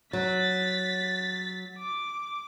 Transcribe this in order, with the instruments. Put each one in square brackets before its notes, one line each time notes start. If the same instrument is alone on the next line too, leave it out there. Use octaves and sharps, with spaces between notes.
[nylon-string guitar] F#3 [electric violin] A6 B6
[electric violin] D6